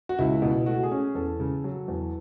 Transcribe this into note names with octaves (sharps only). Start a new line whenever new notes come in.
F#4
C#2 E4
B2
A3 F#4
G#4
C#4
E2 A4
C#3
F#3
E2